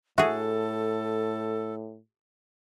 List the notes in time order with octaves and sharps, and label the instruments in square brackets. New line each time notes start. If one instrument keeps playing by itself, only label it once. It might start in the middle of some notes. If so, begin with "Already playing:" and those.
[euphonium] A2 [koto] F#4 G#4 [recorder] A4 [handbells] E5